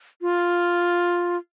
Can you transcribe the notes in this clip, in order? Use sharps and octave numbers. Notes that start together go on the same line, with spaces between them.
F4